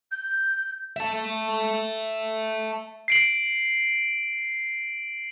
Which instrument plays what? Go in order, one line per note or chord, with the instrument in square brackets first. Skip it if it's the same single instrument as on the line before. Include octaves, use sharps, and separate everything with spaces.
[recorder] G6
[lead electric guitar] E5 A5
[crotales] C7 D7 F#7